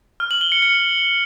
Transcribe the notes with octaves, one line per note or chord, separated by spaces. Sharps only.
F6
F#7
G7
C#7
C#7